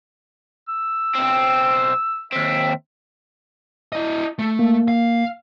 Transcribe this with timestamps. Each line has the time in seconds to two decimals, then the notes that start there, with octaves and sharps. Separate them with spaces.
0.68 E6
1.15 B1 C4
2.33 D#2 C4 E5
3.93 E4 D#5
4.39 A3
4.59 A#3
4.88 F5